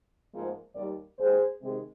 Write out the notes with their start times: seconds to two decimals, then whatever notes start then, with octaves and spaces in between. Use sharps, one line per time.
0.32 G#2 F3 A#3
0.75 D#2 D#3 G3 A#4 D5
1.18 D#2 D#3 G#3 G#4 C5
1.61 C3 D#3 G#3